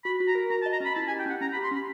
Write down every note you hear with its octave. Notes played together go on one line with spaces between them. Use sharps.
F#4 B5
F#4
A#5
A#4
F#4 A#5
A5
D#5
A#5
C#4 B5
E4 A5
G#5
G4
G5
C#4 F#5
C#4 A#5
B5
G4
C6
C#4 B5